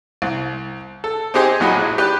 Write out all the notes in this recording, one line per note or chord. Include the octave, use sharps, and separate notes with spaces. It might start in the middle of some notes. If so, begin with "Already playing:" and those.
C2
A4
C4 D#4 G4 G#4 C5
A#1 A2 F#3 D#4 G#4 B5
G4 B4 D5 G5